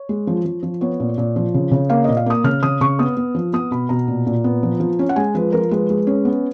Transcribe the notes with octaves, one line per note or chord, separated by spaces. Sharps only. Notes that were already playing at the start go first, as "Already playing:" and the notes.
Already playing: C#5
G#3
F3
F3
F3
B3 C#5
A#2
A#2
F3
C#3
C#3
A#3 F5
A#2 D#5
F5
A#3 D#6
C#3 F6
C#3 D#6
C#3 C#6
B3 D#6
B3
F3
B3 D#6
B2 B5
B2 A#5
A#2
A#2
B3
F3
F3
C#4
F#5
G#3 G#5
F3 B4
F3 A#4
G#3 B4
G#3
C#4
B3